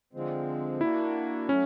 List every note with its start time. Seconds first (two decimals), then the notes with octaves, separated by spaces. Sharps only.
0.13 D3 F3 G#3 C4
0.81 A#3 D4 E4 F#4
1.48 F#3 A3 C#4